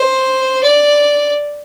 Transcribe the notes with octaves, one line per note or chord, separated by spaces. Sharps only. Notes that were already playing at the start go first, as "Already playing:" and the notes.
Already playing: C5
D5